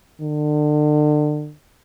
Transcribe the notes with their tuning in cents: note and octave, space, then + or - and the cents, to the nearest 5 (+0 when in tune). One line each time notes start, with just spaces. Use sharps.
D3 +35